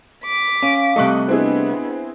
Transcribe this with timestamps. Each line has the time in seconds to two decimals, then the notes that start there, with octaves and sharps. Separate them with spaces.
0.24 D6 B6
0.63 C#4 F5
0.96 C3 G3 A3 D#5 C#6 F#6
1.28 B3 C4 D4 E4 G#4 D#5